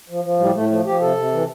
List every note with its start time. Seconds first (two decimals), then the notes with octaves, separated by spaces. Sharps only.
0.09 F3
0.24 F3
0.40 A2 G3
0.54 A2 A3
0.70 F3 A3
0.85 F3 G4
1.01 C3 A4
1.17 C3
1.32 E3